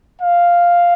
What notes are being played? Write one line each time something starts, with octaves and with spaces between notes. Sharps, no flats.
F5